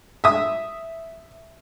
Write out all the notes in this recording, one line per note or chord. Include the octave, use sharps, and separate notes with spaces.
E5 D#6